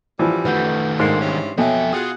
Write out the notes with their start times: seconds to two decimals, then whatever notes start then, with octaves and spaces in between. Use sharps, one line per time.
0.19 F#2 E3 F3 G3
0.45 D#3 A3 B4 F#5 G6
0.99 G#2 D3 A#3 C6 C7
1.20 G2 E3 C#4
1.58 F2 B2 F#3 A4 E5 G5 G#5
1.93 F4 F#4 G#4 D#6 F#6